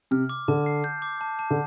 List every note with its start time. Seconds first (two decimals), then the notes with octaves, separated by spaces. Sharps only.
0.11 C3 F6
0.29 D6
0.48 D3 A5
0.66 C7
0.84 G6
1.02 D6
1.21 A5
1.39 A5
1.50 D3